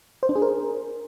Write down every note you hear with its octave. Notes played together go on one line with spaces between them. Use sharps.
C5
D4
G#4
A#4